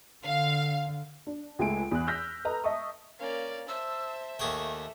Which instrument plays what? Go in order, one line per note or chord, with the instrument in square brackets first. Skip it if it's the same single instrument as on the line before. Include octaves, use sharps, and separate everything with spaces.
[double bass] D3 [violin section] F5
[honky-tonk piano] D4
C#2 G#3 A3 G#5 D7
E2 F#6
E6 F6 G6 A#6 B6
A4 B4 D#5 A#5
D#5 E5 A5 C#6 D#6
[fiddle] A#3 C#4 [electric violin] D5 F5
[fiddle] C5 A5 [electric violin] E5 [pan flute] E6
[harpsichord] D#2 G#4 G5 [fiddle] A3 [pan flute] C#6